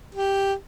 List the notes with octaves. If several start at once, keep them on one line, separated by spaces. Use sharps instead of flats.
G4